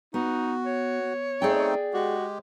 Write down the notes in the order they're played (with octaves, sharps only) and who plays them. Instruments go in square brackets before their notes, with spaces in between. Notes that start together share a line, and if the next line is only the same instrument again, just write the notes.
[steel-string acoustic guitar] B3 [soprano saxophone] D#4 [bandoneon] F#4
[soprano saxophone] C#5
[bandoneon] A3 C4 D#4 [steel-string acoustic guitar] G#4 D5 G5
[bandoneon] G#3 G4 [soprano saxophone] F#4